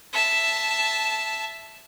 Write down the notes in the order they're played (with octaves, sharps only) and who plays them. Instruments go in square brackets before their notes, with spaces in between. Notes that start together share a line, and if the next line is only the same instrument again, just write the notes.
[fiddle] E5 A5